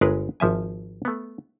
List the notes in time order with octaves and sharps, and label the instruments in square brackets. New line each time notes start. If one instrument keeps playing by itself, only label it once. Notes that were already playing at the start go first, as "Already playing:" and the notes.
[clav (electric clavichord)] G1 G#3 G#4 A#4 B4
G#1 F3 E5 G#5
A3 B3